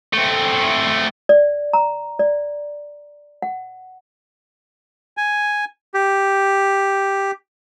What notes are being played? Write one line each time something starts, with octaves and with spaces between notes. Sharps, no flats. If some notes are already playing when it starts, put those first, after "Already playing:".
A3 C4
D5
A#5
D5
F#5
G#5
G4